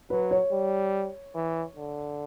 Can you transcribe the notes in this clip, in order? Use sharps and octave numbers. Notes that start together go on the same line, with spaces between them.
F#3 B4
C#5
G3
E3
D3